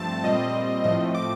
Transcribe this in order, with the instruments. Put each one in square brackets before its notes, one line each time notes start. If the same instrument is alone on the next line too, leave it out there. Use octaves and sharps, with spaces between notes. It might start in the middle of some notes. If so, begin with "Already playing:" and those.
Already playing: [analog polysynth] G2 F3 A3 C4 A5
A#2 G3 C4 D#5
A2 F3 A3 C4 D#5
D6